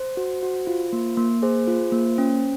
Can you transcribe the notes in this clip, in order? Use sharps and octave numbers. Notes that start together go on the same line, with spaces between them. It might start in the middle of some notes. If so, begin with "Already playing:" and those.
Already playing: C5
F#4
F#4
F4
A#3
A#3
G#4 C5
F4
A#3
C#4